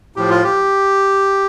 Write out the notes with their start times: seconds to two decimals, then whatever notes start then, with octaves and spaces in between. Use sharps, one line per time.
0.16 A2 F3 G4
0.30 F4
0.44 G4